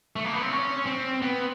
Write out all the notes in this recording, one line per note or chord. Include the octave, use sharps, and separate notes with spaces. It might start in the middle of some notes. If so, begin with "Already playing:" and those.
A3
A#3
B3
C4
C#4
C4
B3